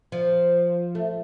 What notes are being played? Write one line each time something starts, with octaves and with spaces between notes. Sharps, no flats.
F3
A3